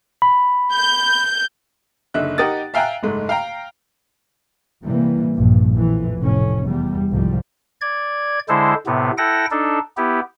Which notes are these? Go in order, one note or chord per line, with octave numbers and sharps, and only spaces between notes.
B5
G6
F#1 D3 D#4 E5 F#6
D#4 G4 A#4 F#5 D#6 A6
E5 F5 G5 G#5 A#5 F#6
F#1 G#2 G#3 A3
F5 G5 A#5
A2 C3 E3 G3 A#3
A#1 G2
F2 A2 E3
F1 A2 C#4
E2 G3
C2 G#2 F3 G3
D5 G#6
D3 G#3 E4 A4 C5
A2 C3 B3
E4 A4 F#5 G5 A#6
D4 D#4 A4
B3 E4 G4